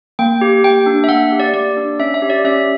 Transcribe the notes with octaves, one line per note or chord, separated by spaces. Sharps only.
A#3 G5
G4
A#3 G5
D4
E5
A#3 F#5
G4
D5
A#3 D5
D4
C#4 E5
E5
G4
D5
C#4 E5